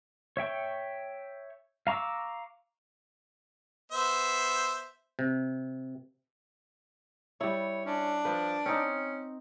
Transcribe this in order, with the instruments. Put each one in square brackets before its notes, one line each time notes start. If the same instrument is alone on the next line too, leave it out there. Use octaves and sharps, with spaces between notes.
[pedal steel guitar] C#5 E5 G5 C#6
F5 A#5 C#6 D6 E6
[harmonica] B3 C5 E5
[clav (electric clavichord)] C3
[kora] G3 E4 [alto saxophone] C#5
[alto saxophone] C#4 [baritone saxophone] D4
[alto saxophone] F3 [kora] B4
[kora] C4 D#4 [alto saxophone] C#4